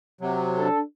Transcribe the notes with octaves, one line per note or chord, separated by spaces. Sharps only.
C3 F#3
D4 A4